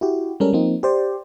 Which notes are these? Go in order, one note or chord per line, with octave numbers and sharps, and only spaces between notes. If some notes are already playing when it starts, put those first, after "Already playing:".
E4 F#4 G4
G3 G#3 C#4 A4 A#4
F3 A#3 C4 D#4
G4 C5 D5